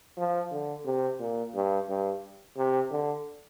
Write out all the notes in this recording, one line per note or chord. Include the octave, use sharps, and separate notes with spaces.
F3
D3
C3
A#2
G2
G2
C3
D3